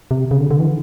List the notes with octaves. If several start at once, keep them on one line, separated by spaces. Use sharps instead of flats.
C3
C#3
D3
D3
E3